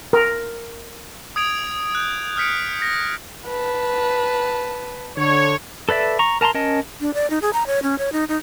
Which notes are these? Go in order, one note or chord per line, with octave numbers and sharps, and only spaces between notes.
A#4
D#6 G#6 D7 F7
F#6 G6
D#6 F6 G6 B6 C#7 D7
A#6
B4 A5
D3 C#5
A4 B4 D5 E5
A#5 C#6
A#4 A5 A#5 C6
C#4 A#4 D#5 A5
D4
D5
D#4
G#4
A#5
C#5
C#4
C#5
D#4
D#4